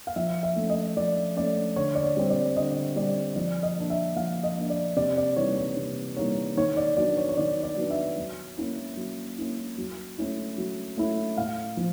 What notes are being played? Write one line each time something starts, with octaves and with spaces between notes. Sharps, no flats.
F5
F3 E5
E5
A3 C#4
D#5
F3 D5
A3 C#4 D5
D3 C#5
D5
C#5
G3 C4
D5
D3 D#5
G3 C4 D5
F3 D5
D#5
A#3 D4
E5
F3 F5
D#5
A#3 D4
D5
C3 D5
D5
E3 G3 A#3 D#4 C#5
C#5
C3
E3 G3 A#3 D#4 C#5
D#3 C#5
D5
F#3 B3 D4 D5
C#5
C#5
D#3 D5
D5
F#3 B3 D4
E5
F#3
A#3 C#4 E4
F#3
A#3 C#4 E4
F#3
A3 C#4 E4
F#3
A3 C#4 E4
A2 F5
F3